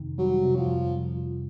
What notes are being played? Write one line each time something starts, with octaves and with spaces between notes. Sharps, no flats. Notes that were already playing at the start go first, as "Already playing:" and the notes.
Already playing: F2 C3 D#3
F#3 G3
C3
F3
F2